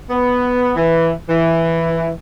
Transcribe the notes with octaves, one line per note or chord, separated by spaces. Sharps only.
B3
E3
E3